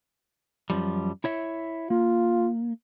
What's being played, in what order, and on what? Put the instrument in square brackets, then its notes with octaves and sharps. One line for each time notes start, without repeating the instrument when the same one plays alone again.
[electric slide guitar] F#2 F3 G3
E4 C#5 E5
[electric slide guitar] A#3 [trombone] F4